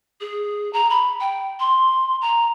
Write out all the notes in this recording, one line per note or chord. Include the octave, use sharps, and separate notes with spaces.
G#4
A#5
B5
G5
C6
A#5